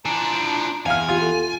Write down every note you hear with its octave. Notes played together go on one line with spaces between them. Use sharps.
E3 F3 D4 A#5
E2 F5 G#5 F6
F4 G4
A4